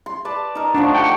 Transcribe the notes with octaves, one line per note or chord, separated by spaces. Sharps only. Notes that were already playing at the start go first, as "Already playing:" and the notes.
C6
B4 D5 A5
D#4 A#4
F3 A3 D4 F#4
G4 F#5 G5